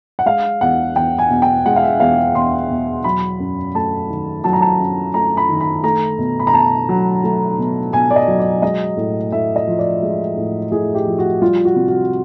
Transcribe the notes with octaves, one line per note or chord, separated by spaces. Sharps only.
F#5
G#3 F5
E2 F#5
E2 G5
G#5
B2
G5
G#3 F#5
F5
E5
E2 F5
E2 C6
B2
F#3 B5
F#2
A3 A5
D#3
F#3 A5
A#5
A5
F#2
A3 A#5
B5
D#3
B5
A3 A#5
B2
B5
A#5
B2 A5
F#3
A3
B2
B2 G#5
D5
D#5
F#3
D5
G#3 D#5
A2
A2 E5
D#5
F3
D5
G#3
A2
A2 G#4
G4
F3
F#4
G3 F4
F#4
C3
F#4